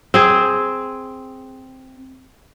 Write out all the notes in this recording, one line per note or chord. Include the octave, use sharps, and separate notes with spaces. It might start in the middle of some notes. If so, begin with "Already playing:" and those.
C4 G#4